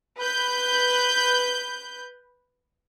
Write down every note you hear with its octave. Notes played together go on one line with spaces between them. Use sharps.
B4 G6